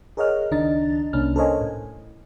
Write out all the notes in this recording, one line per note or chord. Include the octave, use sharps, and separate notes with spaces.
G#4 A#4 C#5 D#5 F#5 F6
C#2 D#3 D4 D#5 A#5 A6
C2 A#3 C#4 D4 F6
A4 A#4 C5 C#5 D#5 G#5
A2